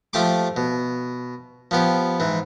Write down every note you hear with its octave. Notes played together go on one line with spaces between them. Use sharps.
F3 A3 G4 C6 D6
B2
F3 B3 G4
G#2 E3